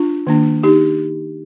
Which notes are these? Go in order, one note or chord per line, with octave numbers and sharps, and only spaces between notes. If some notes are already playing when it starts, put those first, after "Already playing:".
Already playing: D4 F4
D#3 A#3 D4
D#4 G4